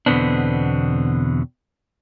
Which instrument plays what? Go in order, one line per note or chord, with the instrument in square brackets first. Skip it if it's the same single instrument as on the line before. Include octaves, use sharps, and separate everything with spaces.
[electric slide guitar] E2 B2 D3 B3 C4 D4